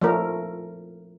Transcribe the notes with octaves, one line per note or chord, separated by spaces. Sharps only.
F3 A3 A#4